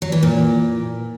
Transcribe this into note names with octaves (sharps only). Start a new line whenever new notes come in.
F#3
E3
A#2